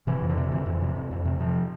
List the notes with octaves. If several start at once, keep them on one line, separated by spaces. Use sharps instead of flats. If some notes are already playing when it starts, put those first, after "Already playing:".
C3 E3
F2
D3
C3
F2 E3
F2
C3
F2
F2
C3
C3 F3